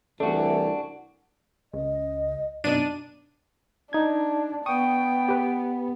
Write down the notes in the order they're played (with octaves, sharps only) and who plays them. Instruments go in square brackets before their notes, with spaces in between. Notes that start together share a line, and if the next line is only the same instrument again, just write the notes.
[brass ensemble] C2 [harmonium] E3 [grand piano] A3 [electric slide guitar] D4 F#4
[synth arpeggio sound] C#2 [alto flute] D#5
[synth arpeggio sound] F#2 B2 D#4 [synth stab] D4 D#7
[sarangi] D4 [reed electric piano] D#4 G#6
[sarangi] B3 [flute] G5 [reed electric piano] C#6 D#6
[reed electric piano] G4 B4